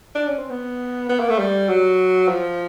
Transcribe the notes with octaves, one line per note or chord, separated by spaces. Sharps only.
D4
C#4
C4
B3
B3
A#3
A3
G3
F#3
F3